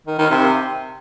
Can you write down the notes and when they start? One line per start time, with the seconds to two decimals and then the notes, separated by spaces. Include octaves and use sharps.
0.07 D#3
0.19 D#3
0.30 C3